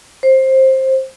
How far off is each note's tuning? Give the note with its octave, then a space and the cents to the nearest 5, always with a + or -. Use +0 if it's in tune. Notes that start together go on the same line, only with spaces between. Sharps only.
C5 +15